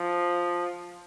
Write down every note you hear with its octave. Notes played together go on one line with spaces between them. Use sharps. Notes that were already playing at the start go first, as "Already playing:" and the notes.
Already playing: F3